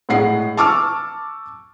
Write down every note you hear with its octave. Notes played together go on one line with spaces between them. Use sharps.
A2 G#3 F#5 C7
A5 C#6 D6 E6 F6